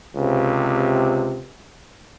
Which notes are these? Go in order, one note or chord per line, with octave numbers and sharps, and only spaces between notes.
C#2 C3